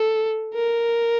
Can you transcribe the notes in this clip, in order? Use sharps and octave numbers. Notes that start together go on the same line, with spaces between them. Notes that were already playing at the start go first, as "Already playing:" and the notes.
Already playing: A4
A#4